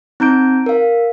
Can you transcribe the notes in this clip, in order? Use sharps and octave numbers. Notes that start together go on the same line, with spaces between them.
C4 D#4 A#5 G6 D7
A#4 F5